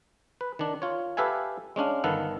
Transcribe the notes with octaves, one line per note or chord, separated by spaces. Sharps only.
B4
D#3 D4
F4 C#5
G4 A4 B4 E5 F5 G#5
G#3 C#4 D4 F5
G1 D#3 B3 A4 F5 F#5